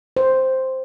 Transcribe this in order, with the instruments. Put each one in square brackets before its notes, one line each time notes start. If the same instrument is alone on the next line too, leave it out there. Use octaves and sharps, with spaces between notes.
[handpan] C5